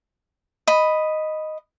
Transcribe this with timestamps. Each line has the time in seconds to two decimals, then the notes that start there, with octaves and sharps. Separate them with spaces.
0.67 D#5 B5